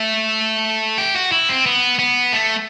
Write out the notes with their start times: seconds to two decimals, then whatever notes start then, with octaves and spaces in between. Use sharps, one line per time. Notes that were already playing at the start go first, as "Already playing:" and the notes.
Already playing: A3
0.98 G4
1.16 F#4
1.32 E4
1.49 C4
1.66 B3
1.99 B3
2.33 A3